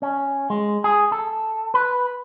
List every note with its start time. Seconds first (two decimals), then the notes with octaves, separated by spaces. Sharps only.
0.02 C#4
0.50 G#3
0.84 G#4
1.12 A4
1.74 B4